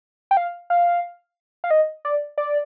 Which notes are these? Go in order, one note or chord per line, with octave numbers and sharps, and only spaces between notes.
G5
F5
F5
F5
D#5
D5
D5